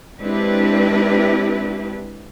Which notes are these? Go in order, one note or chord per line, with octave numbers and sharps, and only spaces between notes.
G#3 C4 D4 E4 G4 B4